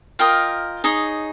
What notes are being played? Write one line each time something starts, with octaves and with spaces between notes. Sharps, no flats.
F4 A#4 D#5 F5 G5
D#4 G#4 C#5